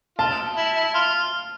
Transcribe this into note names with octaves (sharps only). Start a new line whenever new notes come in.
F4 A5
E4
E4
F4